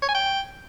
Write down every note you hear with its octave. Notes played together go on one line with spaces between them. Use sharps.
C#5
G#5
G5